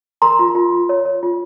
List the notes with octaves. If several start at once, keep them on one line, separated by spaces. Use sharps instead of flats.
A#4 A#5 C6
F4
F4
F4
C#5
C#5
F4